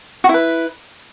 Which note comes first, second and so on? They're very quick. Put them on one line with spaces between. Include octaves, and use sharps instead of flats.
F#4 E4 B4